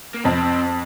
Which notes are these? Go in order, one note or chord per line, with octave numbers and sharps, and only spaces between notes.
A#3
F2 C4